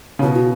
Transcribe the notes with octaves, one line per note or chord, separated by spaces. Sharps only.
C#3
B2 E4
F#4